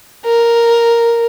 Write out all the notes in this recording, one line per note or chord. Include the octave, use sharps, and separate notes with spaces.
A#4